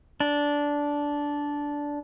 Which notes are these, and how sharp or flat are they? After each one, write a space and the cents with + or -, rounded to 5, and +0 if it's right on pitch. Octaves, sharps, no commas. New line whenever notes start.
D4 -10